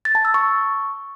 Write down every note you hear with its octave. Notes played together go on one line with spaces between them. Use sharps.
A6
A5
E6
C#6